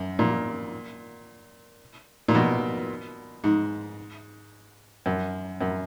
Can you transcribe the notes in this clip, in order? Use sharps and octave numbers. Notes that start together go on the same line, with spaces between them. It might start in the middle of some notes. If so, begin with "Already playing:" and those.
Already playing: F#2
A#2
A#2
B2
G#2
F#2
F#2